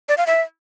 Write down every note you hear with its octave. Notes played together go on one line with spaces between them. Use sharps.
D5
F5
E5